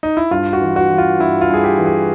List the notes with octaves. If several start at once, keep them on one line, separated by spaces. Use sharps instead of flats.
D#4
E4
G2 F4
F#4
E3
F#4
E3
F4
G2 E4
F4
G2 G#4
G4
E3
G#4